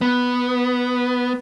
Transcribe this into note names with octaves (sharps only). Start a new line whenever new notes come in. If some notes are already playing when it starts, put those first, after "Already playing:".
B3